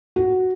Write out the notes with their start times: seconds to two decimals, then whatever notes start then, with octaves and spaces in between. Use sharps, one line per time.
0.16 F#4